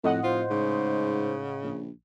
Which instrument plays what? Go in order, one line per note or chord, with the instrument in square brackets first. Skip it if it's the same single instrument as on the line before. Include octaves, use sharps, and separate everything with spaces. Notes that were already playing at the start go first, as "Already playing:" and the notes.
[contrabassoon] F2 [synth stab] A2 D#5 F#5
[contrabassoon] F1 [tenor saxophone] F4 [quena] C5
[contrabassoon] G#2 [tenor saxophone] C#3
[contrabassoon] A#1